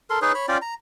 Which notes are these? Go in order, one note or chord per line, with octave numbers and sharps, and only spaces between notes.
A4 A#4 C6
D#4 G#4 B4 C#5
C#5 B5
C#4 F4 D5 G5
A#5